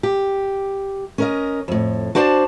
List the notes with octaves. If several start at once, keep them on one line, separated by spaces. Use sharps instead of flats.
G4
C#4 A#4 D#5
F2 A2
D4 F#4 C5 D5 A5